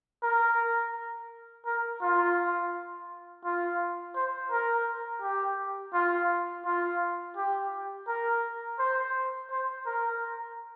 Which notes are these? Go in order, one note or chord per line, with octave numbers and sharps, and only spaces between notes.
A#4
A#4
F4
F4
C5
A#4
G4
F4
F4
G4
A#4
C5
C5
A#4